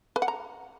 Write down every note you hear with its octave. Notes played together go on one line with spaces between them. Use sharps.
B4
F#5
A#5